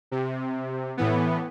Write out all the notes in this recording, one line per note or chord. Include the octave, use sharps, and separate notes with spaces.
C3
A2 E3 B3